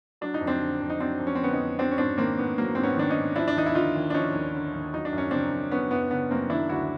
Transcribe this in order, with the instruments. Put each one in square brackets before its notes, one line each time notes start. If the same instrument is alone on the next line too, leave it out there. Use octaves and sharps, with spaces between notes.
[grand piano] F#3 D4
D#4
F2
C4 D4
D3
F2
D#4
F#3 C4 D4
F2
C#4
C4
D3 B3 C#4
C#4 D#4
F2
F#3 C4 D4
C#4
G#2 C4 D4
D#3 A#3 C4
G#2 B3
F#3 A#3
G#2 C4
B3 C#4
D#3 D4
C#4 D#4
G#2
F3 D4 E4
D4
D#2 D#4
E4
D3 D#4 F4
D#2
D4
F3 C#4 D#4
D#2
D3
D#2
F#3 D#4
D4
F#2 C#4
C#3 C4 D4
F#2
F#3 B3 C#4
F#2 B3
C#3 B3
F#2 A#3 C4
D#3 D4 E4
D2 E4 F#4